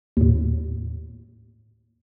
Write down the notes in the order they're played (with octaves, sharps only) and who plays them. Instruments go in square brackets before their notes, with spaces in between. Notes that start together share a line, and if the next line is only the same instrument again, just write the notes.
[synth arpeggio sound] D#2 A2